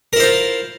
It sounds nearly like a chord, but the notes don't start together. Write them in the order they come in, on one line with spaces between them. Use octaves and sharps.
A#4 E4 C5 F4